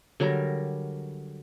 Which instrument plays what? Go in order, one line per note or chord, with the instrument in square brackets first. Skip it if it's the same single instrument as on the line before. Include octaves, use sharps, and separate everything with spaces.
[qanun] D3 F#3 G3 A#4